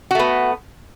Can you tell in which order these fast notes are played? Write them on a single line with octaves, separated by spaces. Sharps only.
F#4 A3 B3